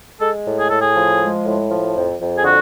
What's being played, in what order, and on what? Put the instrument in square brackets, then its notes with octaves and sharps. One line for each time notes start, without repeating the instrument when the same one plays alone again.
[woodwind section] G#3 A4
A2
G#4
A2 A4
G#4
F3
G#3
A2
F3
F2
F2
G#4
D3 F#4